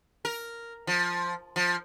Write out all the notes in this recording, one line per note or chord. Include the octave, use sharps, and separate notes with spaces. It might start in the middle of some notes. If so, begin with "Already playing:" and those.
A#4
F3
F3